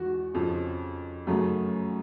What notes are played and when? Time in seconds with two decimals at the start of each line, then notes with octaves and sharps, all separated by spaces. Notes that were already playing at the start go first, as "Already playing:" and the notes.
Already playing: E2 E3 G#3 F#4
0.34 F2 C#3 F3
1.27 F#2 C#3 F#3 A3